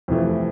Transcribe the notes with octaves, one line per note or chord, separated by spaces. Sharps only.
F2 C3 E3 A3